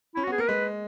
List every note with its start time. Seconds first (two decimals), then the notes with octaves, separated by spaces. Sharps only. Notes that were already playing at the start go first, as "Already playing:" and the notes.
0.15 C#4 E4
0.23 F#4
0.27 B3 G#4
0.38 A#3 A#4
0.48 G#3 B4